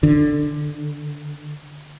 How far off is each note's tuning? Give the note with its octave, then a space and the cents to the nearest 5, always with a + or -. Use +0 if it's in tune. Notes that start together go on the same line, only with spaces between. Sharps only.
D3 +10